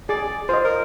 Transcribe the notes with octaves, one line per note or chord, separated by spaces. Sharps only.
G#4 D5
F4 C5 D#5
A#4